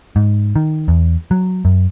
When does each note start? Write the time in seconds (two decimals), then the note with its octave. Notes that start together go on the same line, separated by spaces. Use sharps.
0.16 G#2
0.56 D#3
0.88 E2
1.31 F#3
1.65 F#2